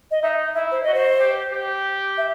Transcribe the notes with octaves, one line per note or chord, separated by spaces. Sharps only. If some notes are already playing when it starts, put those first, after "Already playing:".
D#5
D#4 E5
E4 E5
C5
F#4 D#5
C5
G4
G4
E5